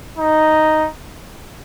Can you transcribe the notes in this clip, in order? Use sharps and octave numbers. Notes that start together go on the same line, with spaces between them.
D#4